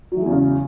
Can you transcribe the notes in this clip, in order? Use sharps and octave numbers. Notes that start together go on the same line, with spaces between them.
E2 C#3 E3 F#3 G#3